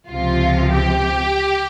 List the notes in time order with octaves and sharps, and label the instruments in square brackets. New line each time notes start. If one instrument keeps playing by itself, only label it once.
[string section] C#2 C3 F3 F4
G4